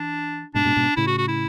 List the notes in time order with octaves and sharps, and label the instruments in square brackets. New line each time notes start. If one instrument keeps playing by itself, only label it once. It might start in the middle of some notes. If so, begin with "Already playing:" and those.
Already playing: [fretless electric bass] E3 [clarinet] D4
[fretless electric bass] G#2 B2 [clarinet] D4
[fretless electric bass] G#2 B2
G#2 B2
[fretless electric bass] A2 C#3 [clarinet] E4
[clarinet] F#4
F#4
E4